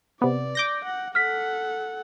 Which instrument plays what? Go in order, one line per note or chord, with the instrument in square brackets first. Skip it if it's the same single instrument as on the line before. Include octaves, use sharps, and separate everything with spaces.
[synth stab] C3 B3 [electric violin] D5
[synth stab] D6 G6 A#6
[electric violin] F#5
[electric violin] A4 F#5 [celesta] F6 B6